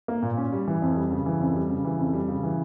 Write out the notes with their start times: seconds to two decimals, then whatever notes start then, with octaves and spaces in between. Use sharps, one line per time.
0.08 A#3
0.22 A#2
0.37 C#4
0.52 G3
0.68 E3
0.82 F2
0.96 G3
1.11 C#3
1.26 E3
1.40 F2
1.55 G3
1.70 C#3
1.85 E3
1.99 F2
2.13 G3
2.28 C#3
2.43 E3